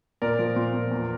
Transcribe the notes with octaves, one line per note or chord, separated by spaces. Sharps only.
A#2 A#4 D5
F3
A#2
A#2
E2